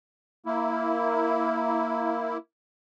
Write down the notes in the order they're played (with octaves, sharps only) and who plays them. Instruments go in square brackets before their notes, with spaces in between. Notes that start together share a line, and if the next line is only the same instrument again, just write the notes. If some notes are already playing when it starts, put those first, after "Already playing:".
[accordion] A#3 E4